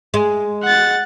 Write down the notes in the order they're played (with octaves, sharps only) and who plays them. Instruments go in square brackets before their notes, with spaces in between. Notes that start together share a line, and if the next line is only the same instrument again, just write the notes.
[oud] G#3
[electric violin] F#5 A6